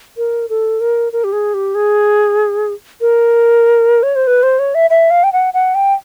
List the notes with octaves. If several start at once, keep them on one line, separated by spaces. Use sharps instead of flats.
A#4
A4
A#4
A#4
G4
G#4
G4
G#4
A#4
C#5
C5
B4
C5
C#5
E5
E5
F5
G5
F#5
F#5
G5